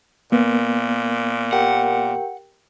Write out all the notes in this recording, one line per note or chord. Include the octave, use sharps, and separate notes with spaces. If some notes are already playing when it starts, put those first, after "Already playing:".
A#2 A#3 B3
G4 A#4 F#5 G5